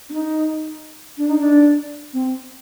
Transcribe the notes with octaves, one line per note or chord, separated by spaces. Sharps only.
D4
D#4
D4
D#4
D4
C4